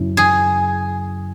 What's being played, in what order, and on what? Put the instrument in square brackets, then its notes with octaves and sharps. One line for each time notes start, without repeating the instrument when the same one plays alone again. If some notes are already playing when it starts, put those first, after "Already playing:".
Already playing: [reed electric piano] F#2 C#3 F#3 C#4 E4
[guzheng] G#4